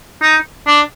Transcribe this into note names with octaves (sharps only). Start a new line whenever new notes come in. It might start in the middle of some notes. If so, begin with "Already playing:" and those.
D#4
D4